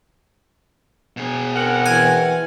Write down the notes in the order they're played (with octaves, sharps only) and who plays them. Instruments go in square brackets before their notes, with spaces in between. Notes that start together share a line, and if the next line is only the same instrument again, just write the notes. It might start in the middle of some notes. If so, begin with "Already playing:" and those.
[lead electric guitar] B2 G#4
[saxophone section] C4 A#4 F#5
[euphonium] E3 [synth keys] G#5